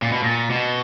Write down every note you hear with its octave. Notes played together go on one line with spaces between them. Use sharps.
A#2
B2
A#2
B2